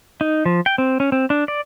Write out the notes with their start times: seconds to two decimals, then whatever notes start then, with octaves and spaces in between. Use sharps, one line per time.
0.21 D#4
0.46 F3
0.66 G5
0.78 C4
1.00 C#4
1.12 C4
1.30 D4
1.48 D5